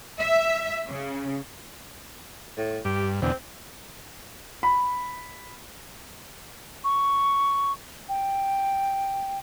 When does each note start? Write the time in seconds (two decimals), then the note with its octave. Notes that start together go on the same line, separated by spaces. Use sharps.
0.20 E5
0.89 C#3
2.58 A2
2.85 G2 G4
3.22 E2 B2 D3 C4
4.63 B5
6.84 C#6
8.09 G5